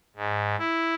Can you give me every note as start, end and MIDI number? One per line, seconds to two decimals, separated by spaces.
0.16 0.56 44
0.58 0.95 64